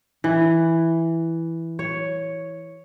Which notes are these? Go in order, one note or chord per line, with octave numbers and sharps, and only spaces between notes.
E3
C#5